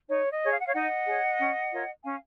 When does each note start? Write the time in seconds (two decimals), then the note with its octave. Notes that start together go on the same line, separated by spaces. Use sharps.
0.09 D#4 C#5
0.31 D#5
0.42 G#4 C#5
0.52 F5
0.60 F#5
0.66 C#5 F5
0.73 D#4 D#5 F#5
1.06 G#4 C#5
1.39 C#4
1.71 F4 A#4 C#5
2.03 C#4 F5 G#5